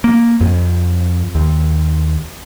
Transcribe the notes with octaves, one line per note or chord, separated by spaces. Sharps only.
A#3
F2
D#2